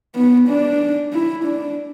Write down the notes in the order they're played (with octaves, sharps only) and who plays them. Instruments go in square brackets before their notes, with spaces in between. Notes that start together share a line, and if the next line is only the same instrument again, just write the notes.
[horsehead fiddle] B3
D4
E4
D4